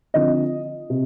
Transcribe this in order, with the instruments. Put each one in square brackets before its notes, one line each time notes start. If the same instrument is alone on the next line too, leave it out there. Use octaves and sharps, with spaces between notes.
[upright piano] D3 F3 C4 D#5
C3